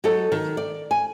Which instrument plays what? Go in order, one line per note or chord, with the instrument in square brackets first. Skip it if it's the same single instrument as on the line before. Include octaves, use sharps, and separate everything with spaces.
[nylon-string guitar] F#3 D#4 A4 C#5
D#3
D5
G#5